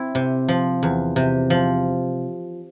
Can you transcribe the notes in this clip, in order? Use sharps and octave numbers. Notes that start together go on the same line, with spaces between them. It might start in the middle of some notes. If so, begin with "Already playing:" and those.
Already playing: C4 E4
C3
F3
E2
C3
F3